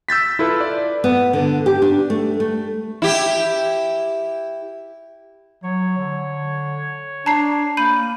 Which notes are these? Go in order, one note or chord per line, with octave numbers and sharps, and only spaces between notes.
E6 G6 A6 B6
E4 F4 A4 B4
D5
B3
D3
G4
D4
A3
A3
E4 G4
F#3 C#5
D3
D4 A5 A#5 C7
A#3 B5 G6 D#7